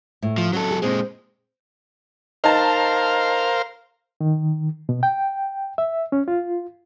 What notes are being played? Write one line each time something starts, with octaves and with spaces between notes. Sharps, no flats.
A2
F3
F#3 C#4 A4
G#4
A#2 G#3 C4
D#4 A#4 C5 F5 A5
D#3
B2
G5
E5
C#4
F4